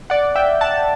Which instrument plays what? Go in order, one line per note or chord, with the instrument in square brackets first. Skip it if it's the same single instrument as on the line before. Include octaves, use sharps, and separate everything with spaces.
[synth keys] D5 F#5
E5 G5
F#5 A5